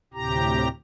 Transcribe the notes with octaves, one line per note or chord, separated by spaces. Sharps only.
D2 A2 C3 G4 A#5